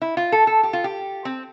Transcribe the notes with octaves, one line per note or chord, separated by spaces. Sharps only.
E4
F4
A4
A4
G4
F4
G4
C4